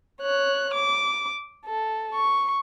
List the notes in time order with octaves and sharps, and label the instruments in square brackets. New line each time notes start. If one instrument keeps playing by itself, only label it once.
[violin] C#5 F#6
D6
A4
C#6